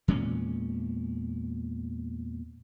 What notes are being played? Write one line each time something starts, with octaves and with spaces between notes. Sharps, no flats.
E2 A#2 G#3 C#4